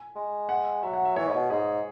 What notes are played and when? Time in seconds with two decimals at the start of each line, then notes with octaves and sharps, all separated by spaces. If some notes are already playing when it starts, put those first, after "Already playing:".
Already playing: G#5
0.15 G#3
0.49 F#5
0.82 F#3 E5
0.93 F#5
1.05 E5
1.16 E3 C#5
1.28 G#2
1.33 B2
1.50 G#2 G#4